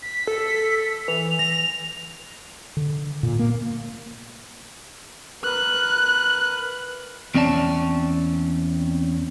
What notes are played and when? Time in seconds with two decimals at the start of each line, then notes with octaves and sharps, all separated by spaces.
0.02 B6
0.27 A4
1.08 E3 F7
1.39 A#6
2.77 D3
3.23 A#2
3.39 A#3
5.44 A#4 B4 F#6
7.35 E2 C4 C#4 D5 A5